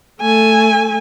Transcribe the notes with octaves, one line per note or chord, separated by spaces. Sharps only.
A3 G#5